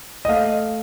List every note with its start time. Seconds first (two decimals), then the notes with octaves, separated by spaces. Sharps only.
0.25 D#5
0.28 A3 F5